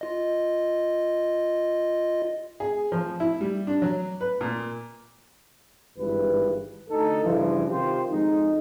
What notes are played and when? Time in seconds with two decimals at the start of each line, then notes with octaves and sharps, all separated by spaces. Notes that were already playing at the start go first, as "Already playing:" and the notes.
0.01 F4 D#5
2.60 G#4
2.92 F3
3.20 E4
3.41 G3
3.67 D4
3.82 F#3
4.21 B4
4.41 A#2
5.98 G#1 G2 E3 B4
6.90 D2 D#4 A4
7.23 G2 C#3 E3 F3
7.69 C3 D#3 F4 G4 C5
8.11 F2 G#3 D#4